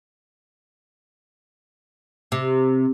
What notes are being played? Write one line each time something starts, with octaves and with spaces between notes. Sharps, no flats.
C3